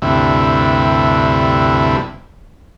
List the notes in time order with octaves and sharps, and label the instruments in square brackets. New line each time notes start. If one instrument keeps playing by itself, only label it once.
[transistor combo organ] D2 G2 C3 E4